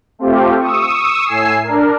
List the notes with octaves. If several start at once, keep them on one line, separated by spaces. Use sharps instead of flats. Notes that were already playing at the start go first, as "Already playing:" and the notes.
A3 C4 F4 G4
C#6 D#6 E6
A2 G#5 E6 C7
D4 A#4